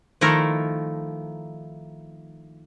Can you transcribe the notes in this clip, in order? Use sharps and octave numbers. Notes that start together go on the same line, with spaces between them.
D#3 F3 A3 E4 A4 A#4